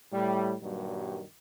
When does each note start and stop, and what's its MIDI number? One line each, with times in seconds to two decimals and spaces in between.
0.12 0.55 45
0.12 0.55 55
0.62 1.23 43
0.62 1.23 46
0.62 1.23 51
0.62 1.23 54
0.62 1.23 55